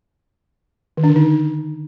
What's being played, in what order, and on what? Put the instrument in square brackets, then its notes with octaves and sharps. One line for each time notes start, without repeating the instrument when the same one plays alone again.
[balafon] D#3
D4
D3
D#4